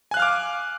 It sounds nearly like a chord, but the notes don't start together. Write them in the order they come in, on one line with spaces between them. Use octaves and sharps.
G#5 F#6 F5 F6 D6